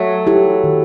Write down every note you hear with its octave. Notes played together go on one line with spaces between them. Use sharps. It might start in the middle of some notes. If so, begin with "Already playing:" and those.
Already playing: F#3 A3
E4 G4
D#3